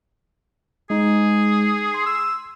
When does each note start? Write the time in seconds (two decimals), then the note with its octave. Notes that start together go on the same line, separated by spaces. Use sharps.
0.90 G#3 D#4 G#4
1.94 C6
2.06 E6